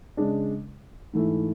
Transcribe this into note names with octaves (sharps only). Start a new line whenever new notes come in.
C#3 G#3 D4
G#2 E3 A3 E4